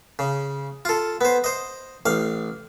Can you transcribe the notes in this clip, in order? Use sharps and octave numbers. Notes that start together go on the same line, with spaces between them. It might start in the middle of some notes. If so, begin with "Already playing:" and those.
C#3
F4 A4
B3 C5
C5 D#5
A1 F5